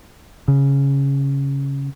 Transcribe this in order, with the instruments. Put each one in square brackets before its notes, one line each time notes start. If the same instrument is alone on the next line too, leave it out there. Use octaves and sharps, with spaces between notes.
[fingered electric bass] C#3